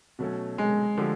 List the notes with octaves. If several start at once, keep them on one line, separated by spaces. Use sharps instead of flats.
B2 F#3 A3 C#4
G#3
D3 F3 A3 D4 G4